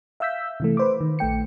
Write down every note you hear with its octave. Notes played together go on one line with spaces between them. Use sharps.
E5 F5 E6 G6 B6
C3 E3 A3
B4 C5 D6
D#3
A#1 A3 G5 C#7